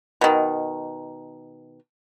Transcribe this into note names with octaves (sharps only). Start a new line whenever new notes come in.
B2 D#3